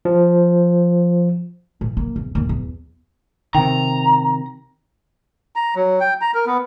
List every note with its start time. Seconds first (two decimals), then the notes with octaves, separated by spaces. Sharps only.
0.05 F3
1.81 A2
1.97 A#3
2.16 E2
2.35 D#2
2.49 E2
3.55 C3 D#3 G5 A#5
5.56 A#5
5.76 F#3
6.00 G5
6.21 A#5
6.35 A#4
6.47 B3